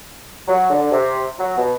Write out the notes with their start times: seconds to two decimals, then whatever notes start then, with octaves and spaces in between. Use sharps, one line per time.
0.48 F#3
0.70 D3
0.92 C3
1.39 F#3
1.57 B2